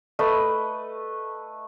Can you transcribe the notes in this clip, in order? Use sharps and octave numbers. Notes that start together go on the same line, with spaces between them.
A3 B4 D#5